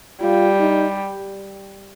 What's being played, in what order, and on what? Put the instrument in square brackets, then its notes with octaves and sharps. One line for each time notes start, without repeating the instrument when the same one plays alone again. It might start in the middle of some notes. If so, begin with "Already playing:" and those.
[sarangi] G3 [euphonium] F4
[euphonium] D#4